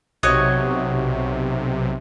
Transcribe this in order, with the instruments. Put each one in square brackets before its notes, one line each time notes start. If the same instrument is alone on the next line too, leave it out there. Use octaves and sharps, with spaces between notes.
[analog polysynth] B1 C3 [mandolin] F#4 C#5 D#5